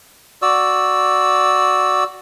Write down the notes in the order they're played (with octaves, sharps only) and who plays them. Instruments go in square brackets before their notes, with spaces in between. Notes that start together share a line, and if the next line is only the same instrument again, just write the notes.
[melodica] F#4 D5 E6